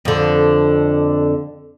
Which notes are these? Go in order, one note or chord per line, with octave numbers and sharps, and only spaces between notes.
F2 D3